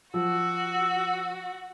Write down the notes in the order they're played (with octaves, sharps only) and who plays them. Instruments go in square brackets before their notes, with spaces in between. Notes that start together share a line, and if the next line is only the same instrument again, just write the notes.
[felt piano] F3 [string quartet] F#4 [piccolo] E6